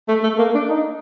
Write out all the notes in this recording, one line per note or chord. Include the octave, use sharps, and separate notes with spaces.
A3
A3
A#3
D4
D#4